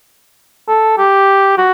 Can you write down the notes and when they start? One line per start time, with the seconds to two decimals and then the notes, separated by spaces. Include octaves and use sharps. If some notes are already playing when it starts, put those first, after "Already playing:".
0.68 A4
0.98 G4
1.58 F#4